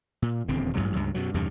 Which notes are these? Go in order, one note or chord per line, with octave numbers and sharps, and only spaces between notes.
A#2
D#1 E2 D3 C4
A1 G2 B2 F#3
C#2 G2
F#2 B2 F#3
E2 G2 C3 D#3